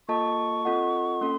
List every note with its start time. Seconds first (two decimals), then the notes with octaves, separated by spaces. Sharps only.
0.08 A#3 F4 A4 D#5 A5 C#6
0.65 C4 F4 A4 D#5 F#5
1.21 A#3 C#4 A4 C6